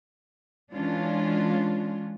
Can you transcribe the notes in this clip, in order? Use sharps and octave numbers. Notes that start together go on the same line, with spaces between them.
E3 G#3 C#4 D4 F4